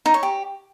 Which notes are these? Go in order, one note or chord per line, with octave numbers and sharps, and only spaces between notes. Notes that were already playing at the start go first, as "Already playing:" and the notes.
D#4
C#5
G4